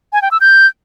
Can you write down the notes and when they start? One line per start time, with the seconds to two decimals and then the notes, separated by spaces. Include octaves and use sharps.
0.13 G#5
0.22 G5
0.31 E6
0.41 G6